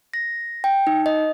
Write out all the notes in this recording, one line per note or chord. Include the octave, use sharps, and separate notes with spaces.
A#6
G5
D#4
D#5